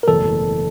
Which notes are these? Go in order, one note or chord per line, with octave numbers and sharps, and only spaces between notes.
A#4
F#1 E2 B2 F#3 A3 A4